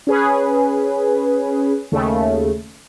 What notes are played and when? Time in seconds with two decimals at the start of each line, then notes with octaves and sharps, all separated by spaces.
0.07 C#4 G#4 B4
1.92 D#2 C#3 A3